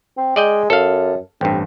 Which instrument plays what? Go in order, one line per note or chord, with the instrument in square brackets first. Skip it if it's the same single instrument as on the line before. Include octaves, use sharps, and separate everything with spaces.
[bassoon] C4
[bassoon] G#3 [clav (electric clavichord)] D5 D#5 G5
[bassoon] F#2 [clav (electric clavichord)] A4 F5
[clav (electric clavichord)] A1 G2 [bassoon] C4